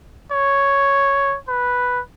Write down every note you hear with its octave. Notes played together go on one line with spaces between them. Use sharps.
C#5
B4